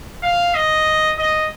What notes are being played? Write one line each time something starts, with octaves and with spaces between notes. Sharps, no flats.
F5
D#5
D#5